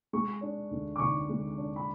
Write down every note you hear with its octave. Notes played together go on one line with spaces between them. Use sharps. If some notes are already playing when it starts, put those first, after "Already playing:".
G#3 C#6
D4
D2
D6
D3 C#6
G#3
D4
B5